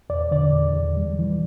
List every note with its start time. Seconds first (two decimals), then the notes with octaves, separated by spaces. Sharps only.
0.10 E2 D5
0.31 D3 D5
0.53 E2
0.75 E2
0.97 G3
1.19 E3